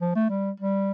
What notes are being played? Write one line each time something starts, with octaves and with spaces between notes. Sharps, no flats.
F3
A3
G3
G3